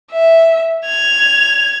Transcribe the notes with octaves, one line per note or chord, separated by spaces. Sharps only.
E5
G#6 F7